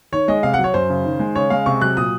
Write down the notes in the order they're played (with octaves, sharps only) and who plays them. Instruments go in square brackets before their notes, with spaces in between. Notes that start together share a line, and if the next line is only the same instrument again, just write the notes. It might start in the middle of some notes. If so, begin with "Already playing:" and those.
[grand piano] D#3 C#5
G#3 D#5
C3 F5
F#3 F#5
C#5
F#2 C5
C#3
D#3
G#3
C#3 C#5
G#3 F5
C3 C#6
F#3 F#6
A#2 D#6